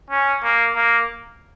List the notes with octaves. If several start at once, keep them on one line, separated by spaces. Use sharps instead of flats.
C#4
A#3
A#3